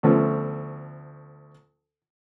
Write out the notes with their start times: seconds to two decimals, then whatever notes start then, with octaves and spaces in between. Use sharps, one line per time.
0.03 D2 F3 A3 B3 C#4